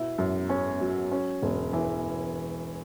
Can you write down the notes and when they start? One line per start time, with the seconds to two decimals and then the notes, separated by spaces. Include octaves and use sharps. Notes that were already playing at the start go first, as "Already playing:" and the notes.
Already playing: B2 E4
0.18 F#2
0.49 C#4
0.81 F#3
1.12 C#4
1.42 E1
1.73 E3